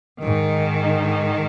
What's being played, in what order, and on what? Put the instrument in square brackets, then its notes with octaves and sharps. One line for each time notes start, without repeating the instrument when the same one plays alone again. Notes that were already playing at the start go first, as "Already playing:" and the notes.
[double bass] G#2 [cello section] D#3